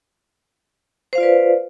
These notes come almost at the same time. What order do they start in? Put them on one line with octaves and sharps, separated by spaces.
C5 F5 F4 D5 B4